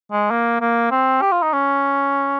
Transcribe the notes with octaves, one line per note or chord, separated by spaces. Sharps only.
G#3
A#3
A#3
C4
G4
F4
D#4
C#4